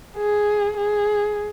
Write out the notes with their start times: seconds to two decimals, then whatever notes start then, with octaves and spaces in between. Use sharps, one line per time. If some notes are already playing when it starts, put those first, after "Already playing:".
0.18 G#4
0.77 G#4